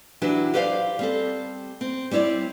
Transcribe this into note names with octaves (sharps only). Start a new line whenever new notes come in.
E3 F#3 D4 G4 B4
G4 B4 C5 D5 E5 F5
G3 C4 A4
C4
G3 C4 E4 C#5 D5